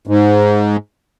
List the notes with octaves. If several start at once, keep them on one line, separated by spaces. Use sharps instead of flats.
G#2